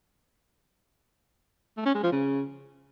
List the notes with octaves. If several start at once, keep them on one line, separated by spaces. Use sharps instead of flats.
A3
C#4
G#3
F3
C#3